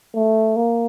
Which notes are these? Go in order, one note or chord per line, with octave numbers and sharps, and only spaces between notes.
A3
A#3